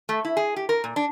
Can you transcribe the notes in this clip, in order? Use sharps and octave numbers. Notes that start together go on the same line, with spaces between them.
A3
E4
G#4
G4
A#4
A#2
D4